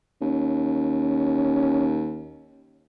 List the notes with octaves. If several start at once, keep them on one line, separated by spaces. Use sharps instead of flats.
D#2 C#4